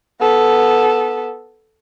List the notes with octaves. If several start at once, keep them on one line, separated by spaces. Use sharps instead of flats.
B3 A4